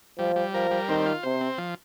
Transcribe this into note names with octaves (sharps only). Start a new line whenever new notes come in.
F3 G3
G3
F3 A#4
G3
D#3 C4
F4
C3 C5
C4
F3